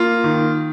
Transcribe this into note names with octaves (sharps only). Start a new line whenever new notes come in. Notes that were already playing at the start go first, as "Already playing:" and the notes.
Already playing: A#3 F4
D#3